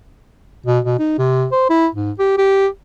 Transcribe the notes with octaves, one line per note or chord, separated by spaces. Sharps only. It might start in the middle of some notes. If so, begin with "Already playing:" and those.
B2
B2
D#4
C3
C5
E4
G#2
G4
G4